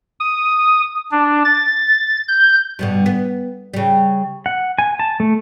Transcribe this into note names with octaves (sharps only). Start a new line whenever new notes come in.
D#6
D4
A6
G6
G2 B2 D3
B3
C#3 G3
F#5
G#5
A5
A3